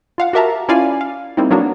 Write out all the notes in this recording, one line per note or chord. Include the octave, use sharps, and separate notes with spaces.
F4 F5 F#5
F#4 G4 A#4 E5 A5 A#5
C#4 E4 F4 D5 F5 G#5
F5
G3 A#3 C4 D#4 E4
F#3 A#3 B3 D4 F#4